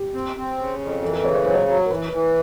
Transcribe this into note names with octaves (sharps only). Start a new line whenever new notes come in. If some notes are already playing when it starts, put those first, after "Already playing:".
Already playing: G4
C4
C4
C#3
F2
E3 A4
A#4
A4
C#3 C#5
C#5
F#3 C5
C#5
F#3
A#4
E3 B4
E3